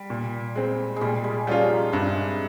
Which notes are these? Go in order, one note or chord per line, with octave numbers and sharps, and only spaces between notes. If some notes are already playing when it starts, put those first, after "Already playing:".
Already playing: G3
A#2
G#3 C4
A#2 G3 G#3
G#3
F3 G3 C#4 F4
D#3
G2 C3